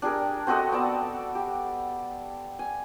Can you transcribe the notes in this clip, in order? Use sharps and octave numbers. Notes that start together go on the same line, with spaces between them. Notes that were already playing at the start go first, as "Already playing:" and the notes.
D4 G4 G#4 A#4
C4 F#4 A4 D#5
B3 D5 A5
G4
G#5